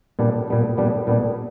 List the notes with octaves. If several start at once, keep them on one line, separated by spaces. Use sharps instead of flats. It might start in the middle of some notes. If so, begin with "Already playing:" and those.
A#2 G3 B3 D4
A#2 G3 B3 D4
A#2 G3 B3 D4
A#2 G3 B3 D4